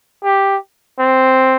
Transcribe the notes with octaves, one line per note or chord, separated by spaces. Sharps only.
G4
C4